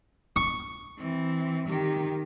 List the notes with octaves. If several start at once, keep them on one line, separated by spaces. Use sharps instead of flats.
C#6
E3 C4
D#3 G4